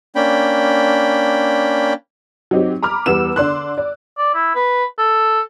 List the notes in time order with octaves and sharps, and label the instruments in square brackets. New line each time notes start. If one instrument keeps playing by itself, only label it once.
[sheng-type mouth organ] A#3 C#4 D4 G5 B5
[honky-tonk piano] F#3 C4 D#4 G4
A#5 B5 D6 F6
E2 G3 B3 B4 E6 E7
D3 D5 C6 F#6
D5
[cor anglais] D5
E4
B4
A4